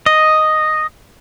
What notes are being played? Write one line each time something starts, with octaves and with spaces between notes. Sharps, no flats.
D#5